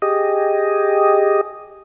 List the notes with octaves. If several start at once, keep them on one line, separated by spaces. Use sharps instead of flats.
G4 G#4 D#5